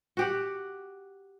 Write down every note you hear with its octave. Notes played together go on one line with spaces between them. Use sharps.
F#4 G4 F#5